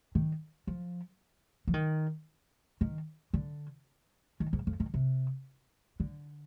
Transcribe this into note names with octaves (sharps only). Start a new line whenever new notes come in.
D#3
F3
F3
D#3
D#3
D3
D#3
G#2
F2
D#3
C3
D3